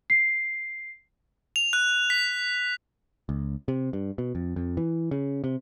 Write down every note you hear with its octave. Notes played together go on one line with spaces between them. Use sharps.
C7
F7
F#6
B6
C#2
C3
G2
B2
F2
F2
E3
C#3
C3